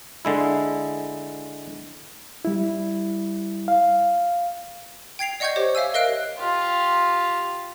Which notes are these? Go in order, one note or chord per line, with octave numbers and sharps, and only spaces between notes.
D3 G#3 E4
G3 E4
F5
G5 G#6 C7 F7
D5 D#5 F#5 C#6 G6 G#6
G4 C5 C#5
C#5 E5 F5 G#5 E6
A#4 D#5 F5 F#6 D7
F4 G4